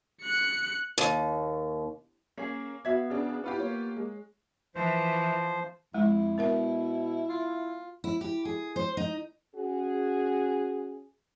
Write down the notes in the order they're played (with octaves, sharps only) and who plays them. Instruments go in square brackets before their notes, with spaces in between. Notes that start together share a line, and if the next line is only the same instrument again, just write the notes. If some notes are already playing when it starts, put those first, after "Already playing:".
[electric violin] F#6 C#7
[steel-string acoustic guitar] D#2
[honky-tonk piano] A#3 [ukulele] C#4 G#4
[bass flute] B3 [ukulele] F#4 E5 F5 [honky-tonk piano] G#6
[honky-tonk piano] C#3 D4
[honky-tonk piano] B3 F4 G4 [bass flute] E4
[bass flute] A#3 [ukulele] C#5
[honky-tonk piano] G#3
[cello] E3 [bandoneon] F3 C5
[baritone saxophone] F2 [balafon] G#3 [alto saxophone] E4
[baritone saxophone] B2 [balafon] B3 A#4 E5
[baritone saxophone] F4
[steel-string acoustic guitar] E4
G4
G#4
C5
D#4
[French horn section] C#4 F#4 G#4